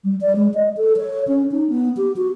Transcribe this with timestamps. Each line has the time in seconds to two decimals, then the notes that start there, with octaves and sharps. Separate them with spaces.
0.04 G3
0.21 D5
0.36 G#3
0.54 D#5
0.77 A4
0.97 C#5
1.28 C#4
1.52 D#4
1.70 B3
1.97 G4
2.16 F#4